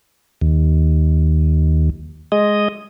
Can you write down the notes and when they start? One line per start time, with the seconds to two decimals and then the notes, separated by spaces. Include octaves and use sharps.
0.41 D#2
2.32 G#3 D#5